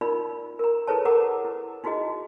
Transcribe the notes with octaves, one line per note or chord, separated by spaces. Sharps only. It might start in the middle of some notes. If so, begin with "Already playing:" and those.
D#4 F4 A#4 D5 B5
A#4 A#5
E4 G#4 A4 B4 C#5 A5
E4 A4 A#4 F#5 A#5 D6
E4
D#4 E4 F#4 G#4 D#5